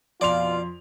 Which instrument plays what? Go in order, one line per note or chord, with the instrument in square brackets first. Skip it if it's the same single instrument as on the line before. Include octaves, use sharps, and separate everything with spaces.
[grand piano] F2 C6 F7 [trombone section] B2 F4 [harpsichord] D5